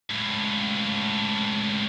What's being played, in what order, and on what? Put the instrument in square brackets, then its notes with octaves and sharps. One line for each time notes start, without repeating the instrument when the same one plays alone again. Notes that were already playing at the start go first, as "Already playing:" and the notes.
[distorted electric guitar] C#2 A2